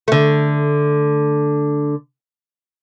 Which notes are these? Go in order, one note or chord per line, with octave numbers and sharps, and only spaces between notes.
D3 A3